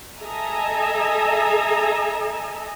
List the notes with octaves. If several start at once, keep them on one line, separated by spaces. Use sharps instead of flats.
A4 D#5 E5 G#5 A#5